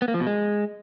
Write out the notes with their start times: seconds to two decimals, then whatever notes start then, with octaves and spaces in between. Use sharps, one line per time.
0.02 B3
0.08 A#3
0.14 F3
0.20 B2
0.27 G#3